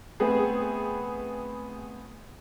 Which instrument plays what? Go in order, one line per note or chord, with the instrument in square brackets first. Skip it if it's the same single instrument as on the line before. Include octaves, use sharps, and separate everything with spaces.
[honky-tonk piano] A3 B3 C4 G#4